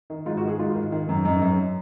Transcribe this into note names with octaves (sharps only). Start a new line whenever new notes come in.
D#3
G#2 F4
F#4
D#3 G#4
G#2 F4
D#3
D#3
F#2
F#2 D#4
F#2